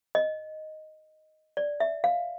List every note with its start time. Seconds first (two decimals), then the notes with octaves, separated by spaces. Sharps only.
0.15 D#5
1.57 D5
1.80 E5
2.04 F5